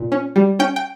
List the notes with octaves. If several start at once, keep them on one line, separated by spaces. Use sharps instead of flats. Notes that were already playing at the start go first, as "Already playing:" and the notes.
Already playing: A#2
C#4
G3
C#4 G5
G5